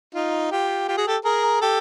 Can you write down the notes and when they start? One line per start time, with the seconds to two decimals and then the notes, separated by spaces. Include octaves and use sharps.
0.15 D#4 F4
0.52 F4 G4
0.88 F4 G4
0.97 F#4 G#4
1.07 G4 A4
1.25 G#4 A#4
1.61 G4 A4